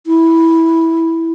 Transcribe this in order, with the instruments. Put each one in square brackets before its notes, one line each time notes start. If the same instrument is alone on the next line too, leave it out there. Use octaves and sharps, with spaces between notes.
[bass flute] E4